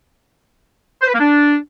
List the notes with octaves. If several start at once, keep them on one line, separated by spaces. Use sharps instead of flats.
C5
B4
A#3
D4